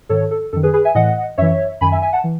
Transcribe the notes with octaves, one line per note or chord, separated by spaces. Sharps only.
G#2 D#3 A4 C#5
A4
F#2 D#3 A4
G#4 B4
G#4 B4
E5 G#5
A2 E3 D#5 F#5
F#2 E3 C#5 E5
F#2 D#3 G#5 B5
E5 G#5
E5 G#5
F#5 A5
E3